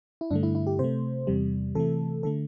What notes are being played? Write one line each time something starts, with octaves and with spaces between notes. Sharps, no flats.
E4
G2 D3 A3 D4
E4
E4
G4
C3 A3 C5
E2 C3 G3
C3 E3 A3 A4
D3 A3 A4